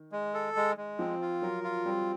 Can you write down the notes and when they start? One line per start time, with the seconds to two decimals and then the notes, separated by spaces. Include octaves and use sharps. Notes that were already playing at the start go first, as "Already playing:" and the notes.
Already playing: D#3
0.12 G#3
0.34 A4
0.56 G#3
0.77 G#3
0.99 F3 C4
1.21 F4
1.42 F#3 A#4
1.64 F4
1.85 G3 C4